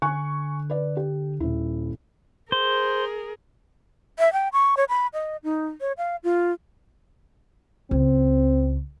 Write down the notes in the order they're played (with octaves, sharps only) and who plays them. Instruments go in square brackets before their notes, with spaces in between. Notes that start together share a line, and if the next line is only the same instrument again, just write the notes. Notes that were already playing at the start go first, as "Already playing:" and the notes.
[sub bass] D3 [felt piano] G#5 C#6 F#6
[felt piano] B4 D5
G4
[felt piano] D#1 E4 [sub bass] D#2
[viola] G#4 A#4 [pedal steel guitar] C5
[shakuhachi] E5
G5
C#6
C#5
B5
D#5
D#4
C#5
F5
F4
[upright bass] C#2 [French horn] C4